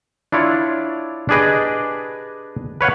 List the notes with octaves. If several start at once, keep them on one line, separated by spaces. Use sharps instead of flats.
D4 E4 F4 C#5 D5
D4 G4 G#4 B4 D5 D#5
B4 C#5 F5 F#5